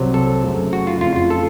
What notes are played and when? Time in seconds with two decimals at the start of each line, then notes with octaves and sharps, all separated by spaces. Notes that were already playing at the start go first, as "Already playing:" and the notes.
Already playing: C2 C3 F#3
0.14 A4
0.43 F#2 C#3 A3
0.73 F#4
0.87 F4
1.01 F2 C#3 A3 F4
1.16 F4
1.30 A4